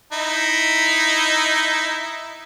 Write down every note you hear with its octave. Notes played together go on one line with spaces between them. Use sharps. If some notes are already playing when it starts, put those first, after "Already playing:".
D#4 E4